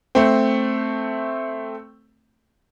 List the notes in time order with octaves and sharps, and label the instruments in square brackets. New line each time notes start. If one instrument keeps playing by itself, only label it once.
[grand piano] A3 C4